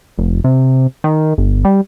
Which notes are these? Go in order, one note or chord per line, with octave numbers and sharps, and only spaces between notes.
F1
C3
D#3
G1
G3